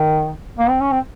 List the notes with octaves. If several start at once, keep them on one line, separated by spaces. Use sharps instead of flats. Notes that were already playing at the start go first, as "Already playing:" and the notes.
Already playing: D#3
A#3
C4
C#4
C4